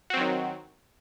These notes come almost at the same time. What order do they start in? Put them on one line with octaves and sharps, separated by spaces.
F#4 C4 F#3 D#3